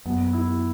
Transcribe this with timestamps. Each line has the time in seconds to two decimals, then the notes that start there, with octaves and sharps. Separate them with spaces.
0.05 F#2 B3
0.33 E4